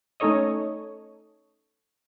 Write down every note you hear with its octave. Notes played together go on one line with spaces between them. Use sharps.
A3 C#4 D#4 A4 C#5 D#5